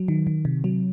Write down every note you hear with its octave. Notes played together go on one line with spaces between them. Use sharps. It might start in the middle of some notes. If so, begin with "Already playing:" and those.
Already playing: F#3
D#3
D#3
C3
F#3